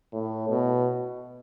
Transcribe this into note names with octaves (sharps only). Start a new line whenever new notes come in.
A2
B2